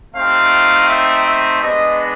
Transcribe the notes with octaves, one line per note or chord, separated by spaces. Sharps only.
A3 C4 D#4 G4 F5
E5
E5
G#3 B3 D4 D#5